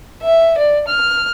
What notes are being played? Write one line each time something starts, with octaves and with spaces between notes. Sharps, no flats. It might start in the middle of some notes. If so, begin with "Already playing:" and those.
E5
D5
F6